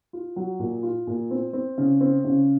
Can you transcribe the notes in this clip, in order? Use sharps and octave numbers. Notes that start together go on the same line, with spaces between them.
F4
F#3
A#2
F4
A#2
C4
C4
C#3
C4
C#3